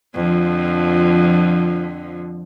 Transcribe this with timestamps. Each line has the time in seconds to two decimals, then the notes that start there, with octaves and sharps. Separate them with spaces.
0.14 F2 D3 F3